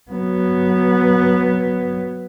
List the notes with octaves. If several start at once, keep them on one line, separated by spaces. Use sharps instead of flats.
F#3 B3